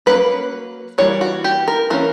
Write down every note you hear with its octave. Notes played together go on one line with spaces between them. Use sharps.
F#3 A#3 C#4 B4
E3 G3 A#3 C#5
F#4
G4
A#4
E3 A#3 C#4 A#4